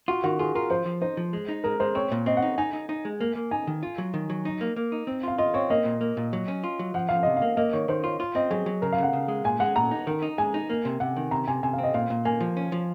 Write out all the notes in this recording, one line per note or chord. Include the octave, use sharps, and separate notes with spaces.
F4 F#4
D#3 F#4
F4 G#4
F4 A#4
F3 C5
F3
D#4 C5
F3
G#3
D#4
G#3 A#4
G#3 C5
C4 C#5
A#2
C4 D#5
F#5
D#4
D#4 G#5
D#4
D#4
G#3
A#3
A#3
D#4 G#5
D#3
F4
F#3
D#3
F#3
D#4
A#3
A#3
D#4
C4
F4 F5
F4 D#5
C4 C#5
A#3 D#5
A#2
A#3
A#2
F#3
C#4
F4
F#3
F3 F#5
F3 F5
C3 D#5
F5
A#3
A#3 D#5
D#3 C#5
D#3 C5
F4 C#5
F4
C4 D#5
F#3 G#4
F#3
C#3 A#4
F5
C#3 F#5
C#3
G#3
A#2 G#5
G#3 F#5
A#2 A#5
D#4
D#3
D#4
G#3 G#5
D#4
A#3
C3
C3 F#5
D#3
C3 A#5
C3 G#5
C3 G#5
F5
C4
D#5
A#2 F5
A#2
A#3 G#5
F3
C#4
F3